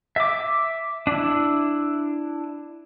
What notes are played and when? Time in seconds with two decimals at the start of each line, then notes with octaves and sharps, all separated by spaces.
0.16 E5 D6
1.07 D4 E4